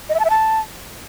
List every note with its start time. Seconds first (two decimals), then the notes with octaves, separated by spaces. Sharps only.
0.09 D#5
0.14 E5
0.20 A5
0.25 E5
0.30 A5